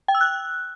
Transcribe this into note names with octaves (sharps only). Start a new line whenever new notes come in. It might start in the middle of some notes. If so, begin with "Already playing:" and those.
G5
E6
F#6